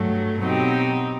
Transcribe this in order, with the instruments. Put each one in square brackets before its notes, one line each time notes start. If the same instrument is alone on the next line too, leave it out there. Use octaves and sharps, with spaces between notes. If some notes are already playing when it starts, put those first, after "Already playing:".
Already playing: [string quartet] G2 F#3 A3
B2 F#3 C4 D#4 G4